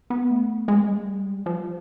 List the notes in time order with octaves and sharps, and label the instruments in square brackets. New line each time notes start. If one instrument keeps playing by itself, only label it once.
[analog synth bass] B3
A3
G#3
G3
F3